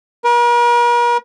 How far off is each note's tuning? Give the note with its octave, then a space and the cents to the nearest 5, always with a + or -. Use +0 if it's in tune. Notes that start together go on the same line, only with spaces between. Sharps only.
A#4 +45